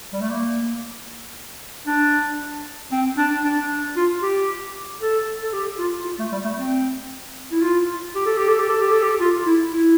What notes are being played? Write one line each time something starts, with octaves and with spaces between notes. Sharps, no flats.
G3
A3
A#3
D4
C4
D4
D4
F4
G4
A4
A4
G4
F4
F4
A3
G3
A3
C4
E4
F4
G4
A4
G4
A4
G4
A4
G4
A4
G4
F4
E4
E4